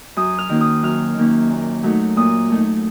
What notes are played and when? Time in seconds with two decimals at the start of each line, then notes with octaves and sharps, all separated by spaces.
0.16 F#2 D#6
0.38 F6
0.49 D#3 A#3 C#4
0.61 D#6
0.83 F#2 F6
1.17 D#3 A#3 C#4
1.50 A#2
1.83 F#3 A3 D#4
2.16 A#2 D#6
2.50 F#3 A3 D#4